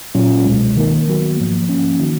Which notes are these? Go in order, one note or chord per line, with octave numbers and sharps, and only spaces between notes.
A#2 F#3 C#4 F4
C#2 B2 G#3
D#3 A#3 D#4 A#4
D#3 F#3 B3 F#4
G#2 F3 A#3
F3 A#3 C#4
D#3 A#3 D#4 F#4